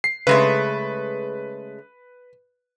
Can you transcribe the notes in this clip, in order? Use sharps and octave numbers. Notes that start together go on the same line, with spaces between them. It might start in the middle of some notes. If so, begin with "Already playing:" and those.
C7
C#3 G#3 A3 B4